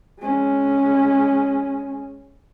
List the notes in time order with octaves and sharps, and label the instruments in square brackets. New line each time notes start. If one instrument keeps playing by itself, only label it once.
[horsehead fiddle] G#3 C#4